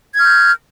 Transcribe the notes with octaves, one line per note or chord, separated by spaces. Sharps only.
F6 G6 G#6